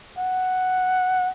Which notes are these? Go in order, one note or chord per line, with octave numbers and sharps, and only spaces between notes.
F#5